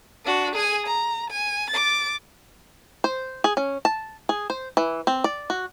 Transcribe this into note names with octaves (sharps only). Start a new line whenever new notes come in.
D4 F#4
G#4 G#5
A#5
G#5
D6 A6
C5
G#4
C#4
A5
G#4
C5
E3
C4
D5
F#4